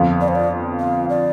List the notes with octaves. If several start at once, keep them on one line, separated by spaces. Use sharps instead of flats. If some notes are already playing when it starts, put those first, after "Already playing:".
Already playing: G1 F2 F3
D5
C5
D5
F5
D5